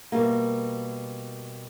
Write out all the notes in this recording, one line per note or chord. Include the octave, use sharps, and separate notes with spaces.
B2 G3 A#3